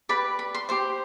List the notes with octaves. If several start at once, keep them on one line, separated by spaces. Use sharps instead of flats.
G4 B4 D5 B5
B5
C6
G4 C5 C6